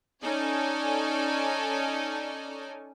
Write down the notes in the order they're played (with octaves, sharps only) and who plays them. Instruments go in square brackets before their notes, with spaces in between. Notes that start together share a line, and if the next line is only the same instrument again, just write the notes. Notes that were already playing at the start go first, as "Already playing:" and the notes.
[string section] C#4 D#4 A4 C#5 D5 G#5